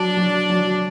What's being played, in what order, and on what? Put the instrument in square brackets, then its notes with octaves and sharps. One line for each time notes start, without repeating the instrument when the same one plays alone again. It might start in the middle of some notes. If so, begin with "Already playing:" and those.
Already playing: [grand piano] F#3 F#4 [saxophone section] D4
[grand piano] F#3
F#3